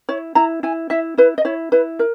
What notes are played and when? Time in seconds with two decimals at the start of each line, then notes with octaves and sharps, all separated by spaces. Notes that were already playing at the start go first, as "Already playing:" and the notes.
0.09 E4 C#5
0.35 E4 A#5
0.63 E4 G#5
0.90 E4 E5
1.18 E4 B4
1.38 D#5
1.45 E4 C#5
1.72 E4 B4
1.99 A#4